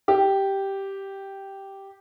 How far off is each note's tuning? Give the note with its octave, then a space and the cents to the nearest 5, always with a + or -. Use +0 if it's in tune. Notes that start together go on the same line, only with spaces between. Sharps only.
G4 -5